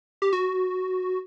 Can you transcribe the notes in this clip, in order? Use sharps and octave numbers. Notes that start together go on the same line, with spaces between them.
G4
F#4